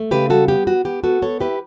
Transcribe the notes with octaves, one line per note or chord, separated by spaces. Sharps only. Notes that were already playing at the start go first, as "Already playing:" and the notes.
Already playing: A3
C#3 G4 B4
G3 F#4 A4
B3 G4
B3 F#4
B3 G4
B3 F#4 A4
B3 A4 C#5
E4 G4 B4